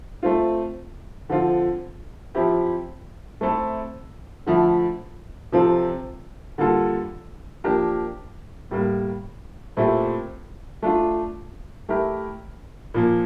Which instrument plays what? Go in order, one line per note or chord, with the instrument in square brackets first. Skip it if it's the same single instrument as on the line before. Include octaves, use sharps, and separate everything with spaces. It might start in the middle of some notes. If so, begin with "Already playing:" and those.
[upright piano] A3 C4 F4
D3 F3 C4 F4
F3 C4 E4 G4
A3 C4 E4 A4
D3 F3 A3 E4
C3 F3 C4 F4 A4
D3 G3 A#3 F4 A4
F3 A#3 D4 G4 A#4
A2 G3 A#3
A#2 A3 C4 E4 G4
A3 D4 F4
A3 E4 G4 A#4
A#2 F3 A#3